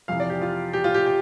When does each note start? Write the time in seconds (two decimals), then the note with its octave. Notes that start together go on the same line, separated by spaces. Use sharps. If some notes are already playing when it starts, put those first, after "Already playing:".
0.08 F2 C3 E3 F5
0.20 D5
0.30 G4
0.41 F4
0.73 G4
0.84 F4
0.94 G4
1.06 G4